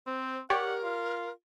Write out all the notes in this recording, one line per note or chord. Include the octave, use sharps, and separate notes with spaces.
C4 C5
G4 A#4 C#5 D5 F#5
F4